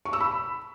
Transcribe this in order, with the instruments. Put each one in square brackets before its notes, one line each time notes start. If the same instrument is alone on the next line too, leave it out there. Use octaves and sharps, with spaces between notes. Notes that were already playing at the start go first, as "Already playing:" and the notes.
[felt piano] C#6
E6
B5